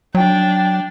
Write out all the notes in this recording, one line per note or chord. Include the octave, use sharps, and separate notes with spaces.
F#3 D4 G5